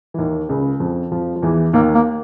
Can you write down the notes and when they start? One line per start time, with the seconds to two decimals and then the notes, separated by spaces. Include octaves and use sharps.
0.14 E3
0.18 D#2 D#3
0.49 C#2 C#3
0.80 F2 F3
1.11 F2 F3
1.36 F3
1.42 E2 E3
1.73 D#2 D#3 A#3
1.94 A#3